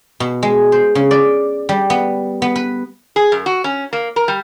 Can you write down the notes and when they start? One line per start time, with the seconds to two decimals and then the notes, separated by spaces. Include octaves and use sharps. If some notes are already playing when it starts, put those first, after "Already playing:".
0.20 B2
0.43 G#3
0.72 C5
0.95 C#3
1.11 D5
1.69 G3
1.90 B3
2.42 B3
2.56 B4
3.16 G#4
3.32 F#2
3.46 F#4
3.64 C#4
3.93 A#3
4.16 A#4
4.28 G3